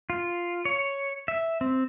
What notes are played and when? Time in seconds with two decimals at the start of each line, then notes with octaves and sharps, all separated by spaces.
0.10 F4
0.65 C#5
1.28 E5
1.61 C4